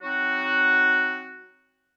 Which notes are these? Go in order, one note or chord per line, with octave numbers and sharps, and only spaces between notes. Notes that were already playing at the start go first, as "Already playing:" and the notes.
F#3 C4 D#4 F#4